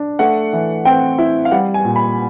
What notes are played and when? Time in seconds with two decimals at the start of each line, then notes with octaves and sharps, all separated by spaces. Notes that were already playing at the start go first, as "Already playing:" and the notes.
Already playing: D4
0.19 A3 F#5
0.53 E3
0.85 C4 G5
1.18 E4
1.45 F5
1.51 G3 F#5
1.74 G#5
1.85 A#2
1.96 B5